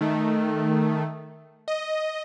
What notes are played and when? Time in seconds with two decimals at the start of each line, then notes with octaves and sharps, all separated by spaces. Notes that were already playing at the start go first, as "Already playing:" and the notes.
0.01 D#3 A3
1.68 D#5